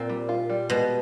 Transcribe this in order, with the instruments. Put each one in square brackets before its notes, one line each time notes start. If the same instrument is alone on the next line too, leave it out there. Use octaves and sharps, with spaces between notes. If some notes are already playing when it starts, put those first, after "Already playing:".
Already playing: [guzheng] A#2 [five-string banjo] C4
[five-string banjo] G3
F4
G3
[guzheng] B2 [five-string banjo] G#3